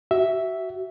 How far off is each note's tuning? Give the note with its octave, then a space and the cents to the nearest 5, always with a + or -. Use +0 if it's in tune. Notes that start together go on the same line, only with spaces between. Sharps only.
F#4 +30 E5 +0